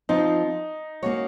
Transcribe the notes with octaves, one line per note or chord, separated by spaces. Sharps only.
F3 C4 D#4 F4
A#3 C#4 F#4 C#5